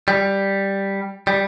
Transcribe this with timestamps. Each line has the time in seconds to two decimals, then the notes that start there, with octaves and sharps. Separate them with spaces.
0.08 G3
1.27 G3